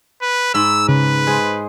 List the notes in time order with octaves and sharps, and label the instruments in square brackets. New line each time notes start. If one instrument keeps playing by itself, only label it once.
[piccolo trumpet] B4
[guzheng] G#2 B5 [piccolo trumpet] E6
[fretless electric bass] C#3 [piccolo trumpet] B4
[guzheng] G#3 G#4 C5